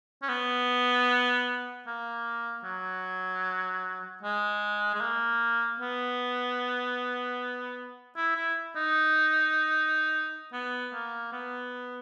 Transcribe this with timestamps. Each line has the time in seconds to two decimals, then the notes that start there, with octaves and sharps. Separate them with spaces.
0.22 C#4
0.29 B3
1.87 A#3
2.64 F#3
4.23 G#3
4.95 G#3
5.01 A#3
5.80 B3
8.16 E4
8.36 E4
8.76 D#4
10.53 B3
10.93 A#3
11.32 B3